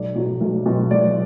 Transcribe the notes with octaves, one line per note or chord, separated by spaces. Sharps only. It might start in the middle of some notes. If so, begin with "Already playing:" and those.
Already playing: B1 D5
B2 F#3
B1
B2 F#3
B1 D5